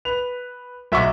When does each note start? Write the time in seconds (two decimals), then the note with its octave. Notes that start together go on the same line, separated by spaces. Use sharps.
0.05 B4 F7
0.92 B1 E5 F#5 C#6